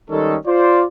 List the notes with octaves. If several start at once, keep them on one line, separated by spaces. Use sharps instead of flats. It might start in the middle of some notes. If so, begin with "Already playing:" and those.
D#3 G3 G#3 C#4 D#4 A4
F4 C5 D5